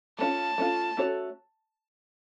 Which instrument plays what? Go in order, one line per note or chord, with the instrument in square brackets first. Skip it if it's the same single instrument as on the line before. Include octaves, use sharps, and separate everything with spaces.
[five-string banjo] A3 C#4 F4 [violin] A5
[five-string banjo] A3 C#4 F4
A3 C#4 F#4 A4 C#5